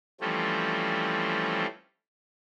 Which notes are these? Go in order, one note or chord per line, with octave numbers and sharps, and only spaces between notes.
E3 F3 G3 A3 C4 C#4